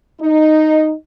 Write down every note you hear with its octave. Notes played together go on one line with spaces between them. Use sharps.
D#4